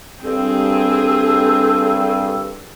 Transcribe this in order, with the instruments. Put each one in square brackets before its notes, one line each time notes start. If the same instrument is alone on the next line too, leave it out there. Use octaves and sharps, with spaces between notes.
[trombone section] C2 G2 [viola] C4 G#4 [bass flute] A4